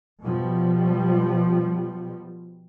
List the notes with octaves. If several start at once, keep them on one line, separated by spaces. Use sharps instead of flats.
B2 F3 G3